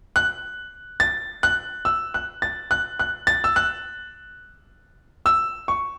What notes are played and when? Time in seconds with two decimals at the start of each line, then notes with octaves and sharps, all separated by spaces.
0.16 F#6
1.00 A6
1.43 F#6
1.85 E6
2.14 F#6
2.42 A6
2.71 F#6
2.99 F#6
3.27 A6
3.44 E6
3.56 F#6
5.26 E6
5.68 C#6